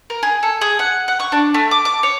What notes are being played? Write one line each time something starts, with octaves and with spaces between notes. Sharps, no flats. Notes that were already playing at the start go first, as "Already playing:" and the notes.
A#4
G#4
A4
G#4
F#5
F#5
C#6
D4
A3
D6
D6
C#5